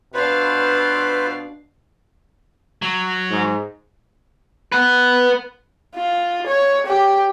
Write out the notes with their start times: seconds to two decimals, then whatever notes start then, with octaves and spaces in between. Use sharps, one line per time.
0.14 B2 D4 F4 B4 C5 F5
2.82 F#3
3.30 G#2
4.72 B4 F#5
5.96 F4
6.47 C#5
6.87 G4